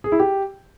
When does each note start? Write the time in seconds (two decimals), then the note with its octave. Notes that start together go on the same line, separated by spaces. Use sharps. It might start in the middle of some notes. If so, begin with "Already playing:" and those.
0.04 G#4
0.12 E4
0.20 G4